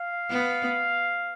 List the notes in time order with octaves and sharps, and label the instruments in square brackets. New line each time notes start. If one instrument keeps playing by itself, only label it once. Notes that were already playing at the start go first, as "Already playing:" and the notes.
Already playing: [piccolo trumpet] F5
[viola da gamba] B3